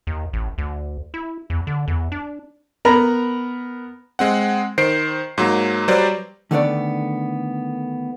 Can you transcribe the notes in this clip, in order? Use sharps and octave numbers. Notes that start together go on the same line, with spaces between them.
D#2
A1
D2
E4
E2
D3
E2
D4
B3 A#4 A#5 B5
G#3 C4 F#5
D#3 C5 C7 D7
G#2 F#3 A#3
F#3 G3 B4 C5 D5
D3 D#3 A3 B3 D4 D5